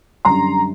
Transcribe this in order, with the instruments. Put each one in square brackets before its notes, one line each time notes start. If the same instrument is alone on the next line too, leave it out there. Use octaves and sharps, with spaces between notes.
[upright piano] F#2 D3 G3 A#5 C6